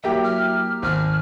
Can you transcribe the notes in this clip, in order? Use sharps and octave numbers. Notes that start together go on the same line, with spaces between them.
F#3 A#3 E4 G4 G5
F6
G#1 F6